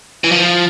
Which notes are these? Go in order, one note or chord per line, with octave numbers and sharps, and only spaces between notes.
E3
F3